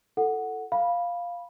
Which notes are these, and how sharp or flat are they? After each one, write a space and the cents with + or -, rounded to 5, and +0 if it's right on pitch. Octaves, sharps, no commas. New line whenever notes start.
F4 -25 A4 +5 F#5 +0
F5 +0 B5 -15